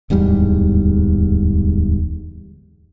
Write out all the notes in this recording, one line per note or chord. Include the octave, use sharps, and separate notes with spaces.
D1 E2 G#2 G3